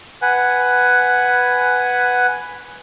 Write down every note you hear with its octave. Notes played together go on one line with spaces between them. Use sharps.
B4 F#5 G#5